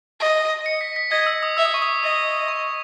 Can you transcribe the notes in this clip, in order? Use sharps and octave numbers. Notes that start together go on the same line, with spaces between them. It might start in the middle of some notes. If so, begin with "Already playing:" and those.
D#5
C#7
B6
B6
D#5 G#6
E6
D#6
E5 E6
D#6
C#6
D#6
D#5
C#6